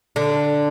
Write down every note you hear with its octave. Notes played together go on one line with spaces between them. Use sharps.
D3